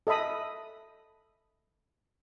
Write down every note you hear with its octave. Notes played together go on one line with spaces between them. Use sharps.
A4 D#5 E5 B5 D#6